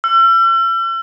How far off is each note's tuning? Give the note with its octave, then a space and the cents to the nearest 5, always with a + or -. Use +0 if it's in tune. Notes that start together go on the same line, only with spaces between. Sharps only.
E6 +45